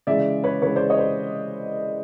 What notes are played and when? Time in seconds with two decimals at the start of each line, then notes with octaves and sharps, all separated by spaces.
0.07 C#3 E3 G#3 D5 E5
0.44 B4 C#5
0.62 C#3 E3 G#3 B4 C#5
0.76 C5 D5
0.90 C#5 D#5
0.99 C5